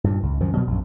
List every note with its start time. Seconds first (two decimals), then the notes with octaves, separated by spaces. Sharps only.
0.04 G2 A#2
0.23 C#2
0.40 F#2 D#3 F3
0.55 B2 F#3 G3
0.67 A#1 F#2